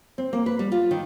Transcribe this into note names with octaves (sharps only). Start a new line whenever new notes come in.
C4
A#3
B4
G3
F4
D#3